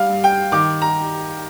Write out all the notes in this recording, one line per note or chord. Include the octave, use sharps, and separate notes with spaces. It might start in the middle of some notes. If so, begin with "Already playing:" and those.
Already playing: G3 F5
G2
G5
D#3 D6
A#5